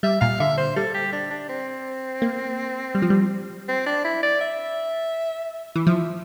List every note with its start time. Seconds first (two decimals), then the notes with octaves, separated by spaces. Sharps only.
0.03 G3 E5
0.21 A#2 F5
0.40 D3 E5
0.58 C5
0.76 G3 A4
0.94 G4
1.13 D4
1.31 D4
1.49 C4
2.22 A#3
2.95 G3
3.02 F3
3.10 G3
3.68 C4
3.86 D4
4.04 E4
4.23 D5
4.41 E5
5.76 E3
5.87 F3 E5